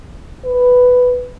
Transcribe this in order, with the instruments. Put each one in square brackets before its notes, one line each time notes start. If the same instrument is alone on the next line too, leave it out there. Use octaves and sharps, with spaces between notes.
[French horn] B4